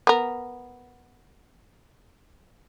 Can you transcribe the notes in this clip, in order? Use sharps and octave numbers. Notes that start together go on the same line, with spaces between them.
B3 A#4